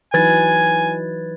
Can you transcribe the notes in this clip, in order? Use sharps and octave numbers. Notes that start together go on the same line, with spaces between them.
E3 F#3 D#4 B4 G#5 G#6 A6